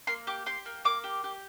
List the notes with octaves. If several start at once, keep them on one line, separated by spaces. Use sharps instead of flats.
A#3 C6
G4 D6
G4 C6
A#3
A#3 D6
G4
G4